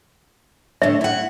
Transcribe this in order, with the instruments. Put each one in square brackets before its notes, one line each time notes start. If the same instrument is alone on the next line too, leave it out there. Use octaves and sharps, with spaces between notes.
[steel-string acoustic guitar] A2 D3 [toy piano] E5
[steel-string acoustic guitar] E4 F#5